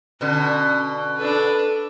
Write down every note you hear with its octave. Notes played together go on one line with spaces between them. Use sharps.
B2 D3 C#4
D4 A4 B4